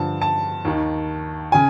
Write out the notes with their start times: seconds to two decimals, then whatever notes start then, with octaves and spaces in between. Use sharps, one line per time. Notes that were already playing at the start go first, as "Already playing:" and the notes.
Already playing: G2 D3 F3 A5
0.22 A5
0.65 D#2 D#3
1.52 C#3 G#5